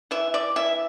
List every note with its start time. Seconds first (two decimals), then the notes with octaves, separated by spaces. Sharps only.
0.11 E3 E5
0.34 D5
0.56 E3 E5